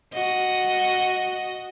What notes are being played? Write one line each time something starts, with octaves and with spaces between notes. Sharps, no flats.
F#4 D#5